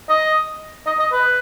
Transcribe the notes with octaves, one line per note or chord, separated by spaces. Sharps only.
D#5
D#5
D#5
B4